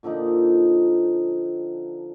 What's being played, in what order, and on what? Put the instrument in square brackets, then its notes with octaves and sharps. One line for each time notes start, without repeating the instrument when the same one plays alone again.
[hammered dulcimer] A#2 D3 F3 D#4